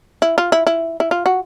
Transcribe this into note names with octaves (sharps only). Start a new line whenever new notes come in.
E4
F4
E4
E4
E4
F4
F#4